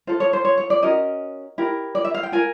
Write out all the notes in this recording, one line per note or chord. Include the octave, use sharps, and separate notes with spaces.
F4 A4 C5
C#5
C5
C#5
C#5
D5
C#4 F#4 A#4 D#5
E4 G4 A#4
D5
E5
F5
G5
F4 A#4 G#5